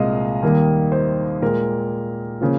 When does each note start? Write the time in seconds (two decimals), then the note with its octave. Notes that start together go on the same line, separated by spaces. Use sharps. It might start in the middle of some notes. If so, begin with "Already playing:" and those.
Already playing: C2 A#2 G#3 D#5 F5
0.42 D#2 D#3 G3 A#3
0.92 C5
1.42 A#2 G#3 A#4
2.41 C#3 F3 A#3